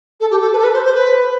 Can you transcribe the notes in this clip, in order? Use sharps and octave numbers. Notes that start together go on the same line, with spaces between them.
A4
G4
A4
B4
A4
B4
C5
C5
B4